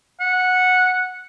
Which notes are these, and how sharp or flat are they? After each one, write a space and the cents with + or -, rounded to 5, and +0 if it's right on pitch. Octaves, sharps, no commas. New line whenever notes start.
F#5 -10